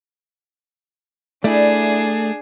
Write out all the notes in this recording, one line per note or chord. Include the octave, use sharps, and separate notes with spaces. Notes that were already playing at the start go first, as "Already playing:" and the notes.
A3 D4 E4 G#4 D5